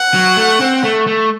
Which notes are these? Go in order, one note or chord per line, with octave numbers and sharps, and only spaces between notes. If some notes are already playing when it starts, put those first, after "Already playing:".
Already playing: F#5
F#3
A3
C4
A3
A3